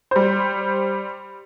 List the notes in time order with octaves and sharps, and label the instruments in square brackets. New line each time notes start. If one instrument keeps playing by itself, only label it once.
[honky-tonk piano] G3 C5